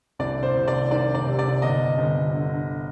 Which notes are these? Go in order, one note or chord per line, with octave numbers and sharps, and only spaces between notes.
C2 D5
C5
C2
D5
D#3 D5
D5
C3
D5
G1 D#5
G1
D3